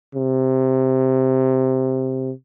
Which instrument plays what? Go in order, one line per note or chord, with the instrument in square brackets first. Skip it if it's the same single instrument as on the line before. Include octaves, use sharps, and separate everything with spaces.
[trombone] C3